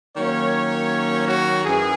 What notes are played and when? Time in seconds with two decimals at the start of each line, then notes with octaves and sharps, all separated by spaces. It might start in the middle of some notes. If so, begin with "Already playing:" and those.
0.16 D#3 F#3 A#3 C#4 C#5
1.28 F#4
1.65 F#2 E3 G#4